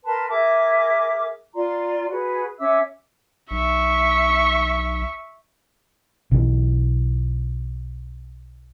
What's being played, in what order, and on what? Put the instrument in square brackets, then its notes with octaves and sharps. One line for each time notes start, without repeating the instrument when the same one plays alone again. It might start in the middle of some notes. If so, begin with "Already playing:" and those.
[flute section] A#4 B4 A5 C6
G#4 A#4 E5 D6
F4 D5 A#5 C6
F#4 G#4 B4
C#4 E5 D6 E6
[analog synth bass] B1 [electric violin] E5 C#6
[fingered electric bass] B1 E3